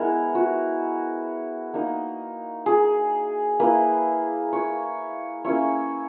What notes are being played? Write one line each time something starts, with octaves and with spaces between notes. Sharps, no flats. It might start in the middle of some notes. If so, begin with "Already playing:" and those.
Already playing: G#3 B3 E4 A#4
F#4
A#3 D#4
G#4
A#3 E4 B4
C#5
A#3 C#4 E4 C#5